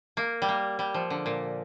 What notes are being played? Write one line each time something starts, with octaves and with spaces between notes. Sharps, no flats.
A#3
G3
A#3
G3
F3
D3
A#2